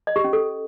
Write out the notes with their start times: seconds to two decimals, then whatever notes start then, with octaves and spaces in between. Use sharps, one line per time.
0.07 D#5
0.16 G4
0.24 C#4
0.33 A4